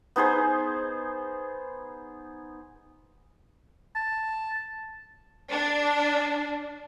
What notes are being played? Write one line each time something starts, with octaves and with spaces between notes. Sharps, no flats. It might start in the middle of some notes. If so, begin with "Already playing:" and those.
B3 D#4 G#4 C5
A5
D4